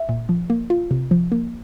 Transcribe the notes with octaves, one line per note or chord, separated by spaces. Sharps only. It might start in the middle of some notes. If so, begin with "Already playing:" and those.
Already playing: E5
A#2
F3
A#3
F4
C3
F3
A#3